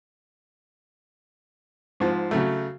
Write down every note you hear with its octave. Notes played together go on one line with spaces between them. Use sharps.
G#2 F3
C#3 F#3 A3